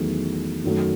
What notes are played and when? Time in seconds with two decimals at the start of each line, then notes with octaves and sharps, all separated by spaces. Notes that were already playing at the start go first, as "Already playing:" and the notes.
Already playing: E2 D#3 F#3 A3
0.64 F#2 D#3 F#3 A3